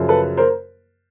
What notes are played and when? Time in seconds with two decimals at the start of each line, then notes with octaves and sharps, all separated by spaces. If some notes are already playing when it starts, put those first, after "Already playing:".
Already playing: F#2 C#3 F3
0.09 A4 B4
0.37 A#4 C5